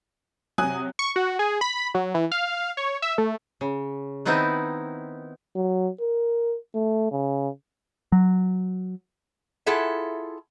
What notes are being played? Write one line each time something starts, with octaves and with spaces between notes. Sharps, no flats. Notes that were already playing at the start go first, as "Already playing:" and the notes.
C3 F#3 G#5 D#6 F#6
C#6
F#4
G#4
B5
F#3
E3
F5
C#5
E5
A3
C#3
D#3 B3 C4 D#4 E4
F#3
A#4
A3
C#3
F#3
E4 F4 G#4 A4 E5 F#5